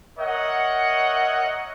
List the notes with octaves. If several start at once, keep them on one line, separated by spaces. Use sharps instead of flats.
A#4 C#5 D#5 E5 F#5